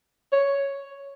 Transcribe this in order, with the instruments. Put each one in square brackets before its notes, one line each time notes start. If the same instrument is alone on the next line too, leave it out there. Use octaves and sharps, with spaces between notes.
[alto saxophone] C#5